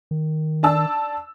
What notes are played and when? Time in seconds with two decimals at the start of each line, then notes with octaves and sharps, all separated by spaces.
0.11 D#3
0.63 D4 A5 E6